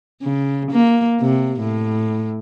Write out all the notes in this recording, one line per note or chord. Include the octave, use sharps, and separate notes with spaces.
C#3
A#3
C3
A2